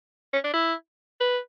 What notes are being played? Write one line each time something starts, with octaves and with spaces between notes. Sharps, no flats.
C#4
D4
E4
B4